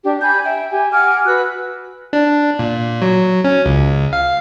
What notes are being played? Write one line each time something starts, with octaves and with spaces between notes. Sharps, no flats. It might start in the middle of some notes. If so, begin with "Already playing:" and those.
D4 G4
G#5 B5 G6
E5 G5
G4 G#5
F#5 G#5 D6 F6
F#4 B4 E6 F#6
D4
A#2
F#3
C#4
C#2
F5